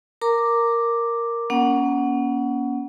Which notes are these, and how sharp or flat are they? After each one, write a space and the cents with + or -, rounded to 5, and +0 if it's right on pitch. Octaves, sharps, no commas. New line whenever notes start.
A#4 +0 A#5 -20 D6 +0
A#3 +45 C#4 +20 F#5 +0